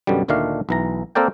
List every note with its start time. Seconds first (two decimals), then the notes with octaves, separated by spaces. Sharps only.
0.07 F#2 B2 D3 G3
0.28 D2 A#2 D#3 A3 D4 F5
0.69 B1 E3 A#5
1.15 A#3 C4 A4 A#4 D5 G5